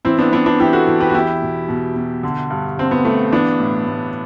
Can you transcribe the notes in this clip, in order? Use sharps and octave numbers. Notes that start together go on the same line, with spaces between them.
E3 C4 E4
B3 D4
E3 B3 D4
B3 D4
E3 E4 G4
F#4 A4
E3
G4 B4
F#4
E2 E4 G4
B2
B2
B2
D3
G2
D3 C4
B3
G2 A3
E3 B3 D4
A2
A2